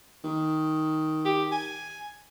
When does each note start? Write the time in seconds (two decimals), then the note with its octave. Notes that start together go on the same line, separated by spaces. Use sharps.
0.24 D#3
1.25 G4
1.52 G#5